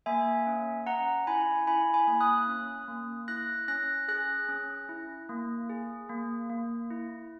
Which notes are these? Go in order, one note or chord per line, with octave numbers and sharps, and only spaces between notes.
A#3 E5 G#5
C#4
C#4 F#5 A#5
E4 G#5 B5
E4 G#5 B5
G#5 B5
A#3
D#6 F#6
C#4
A#3
E4 F#6 A#6
C#4 F#6 A#6
G#4 F#6 A#6
C#4
E4
A#3
G#4
A#3
A#3
E4